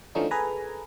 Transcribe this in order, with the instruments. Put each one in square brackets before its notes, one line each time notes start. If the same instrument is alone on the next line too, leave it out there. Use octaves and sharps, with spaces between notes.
[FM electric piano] D3 E3 F3 A3 C#4 D#4
G#4 A4 B4 G#5 A#5